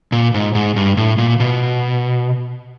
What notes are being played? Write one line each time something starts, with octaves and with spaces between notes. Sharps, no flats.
A#2
G#2
G#2
G2
A2
A#2
B2